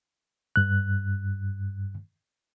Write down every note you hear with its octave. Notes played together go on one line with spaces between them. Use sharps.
G2 F#6